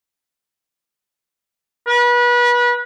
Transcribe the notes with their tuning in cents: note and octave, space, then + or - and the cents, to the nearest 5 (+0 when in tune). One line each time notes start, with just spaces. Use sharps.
B4 -30